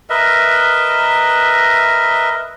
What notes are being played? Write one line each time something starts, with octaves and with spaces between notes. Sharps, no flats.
A#4 B4 D#5 E5